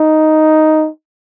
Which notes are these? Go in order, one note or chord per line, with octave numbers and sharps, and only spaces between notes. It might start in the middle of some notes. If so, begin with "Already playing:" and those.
Already playing: D#4